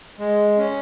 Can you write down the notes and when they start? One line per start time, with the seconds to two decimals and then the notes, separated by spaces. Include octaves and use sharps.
0.19 G#3
0.58 C#4